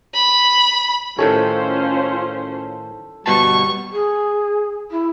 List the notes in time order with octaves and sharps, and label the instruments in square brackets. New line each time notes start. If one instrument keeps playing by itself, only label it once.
[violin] B5
[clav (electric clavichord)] A2 D#3 C#5 [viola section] C#4 F4 C5 [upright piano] A4
[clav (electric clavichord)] G1 B2 A5 [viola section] G3 [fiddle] C#6
[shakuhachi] G#4
E4